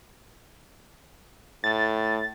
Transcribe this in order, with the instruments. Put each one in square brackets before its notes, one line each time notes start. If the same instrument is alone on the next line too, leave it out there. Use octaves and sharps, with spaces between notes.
[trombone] A2 [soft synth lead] A6